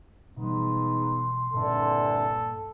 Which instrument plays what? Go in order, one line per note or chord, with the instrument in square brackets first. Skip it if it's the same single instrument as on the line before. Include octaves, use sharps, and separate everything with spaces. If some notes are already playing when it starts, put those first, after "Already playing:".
[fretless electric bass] B2 E3 G3 [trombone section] G#3 B3 D#4 [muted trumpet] C6
[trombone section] C2 D3 E3 [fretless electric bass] G2 A#2 [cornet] A4